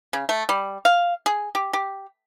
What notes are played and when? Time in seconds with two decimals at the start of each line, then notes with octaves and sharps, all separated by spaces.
0.13 C#3
0.29 A3
0.49 G3
0.85 F5
1.26 G#4
1.55 G4
1.73 G4